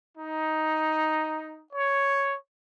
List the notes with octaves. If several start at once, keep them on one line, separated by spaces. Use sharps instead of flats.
D#4
C#5